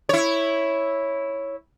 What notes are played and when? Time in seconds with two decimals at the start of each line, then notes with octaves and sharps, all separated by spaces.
0.09 E4 C#5